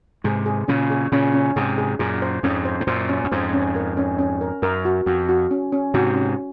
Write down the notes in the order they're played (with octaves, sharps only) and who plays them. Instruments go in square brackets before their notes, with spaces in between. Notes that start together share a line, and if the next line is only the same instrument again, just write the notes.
[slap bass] G#2 C3 [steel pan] G#4
[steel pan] G#4
[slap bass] A#2 C#3 [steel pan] C#4
[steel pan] G#4
[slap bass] A#2 C#3 [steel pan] C#4
[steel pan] C#4
[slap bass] G#2 C3 [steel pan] G#4
[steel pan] G#4
[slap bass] F#2 A#2 [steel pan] G#4
[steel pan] C5
[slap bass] F2 G#2 [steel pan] C#4
[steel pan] C5
[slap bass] G#2
[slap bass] F#2 A#2 [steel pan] C5
[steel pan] C#4
[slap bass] F#2
[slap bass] F2 G#2 [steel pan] C5
[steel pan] C#4
A#4
C#4
C#4
A#4
[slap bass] F#2 [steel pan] A#4
[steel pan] F#4
[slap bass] F2 [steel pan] F#4
[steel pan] F#4
C#4
C#4
[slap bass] G#2 C3 [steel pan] F#4
[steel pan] C#4